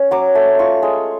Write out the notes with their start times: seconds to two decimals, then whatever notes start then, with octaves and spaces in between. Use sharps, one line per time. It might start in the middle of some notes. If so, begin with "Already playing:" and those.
Already playing: C#4
0.11 F#3 D6
0.35 A3
0.59 F4 C#6
0.83 G#3